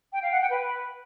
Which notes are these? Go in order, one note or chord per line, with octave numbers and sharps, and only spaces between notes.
G5
F5
F#5
G5
B4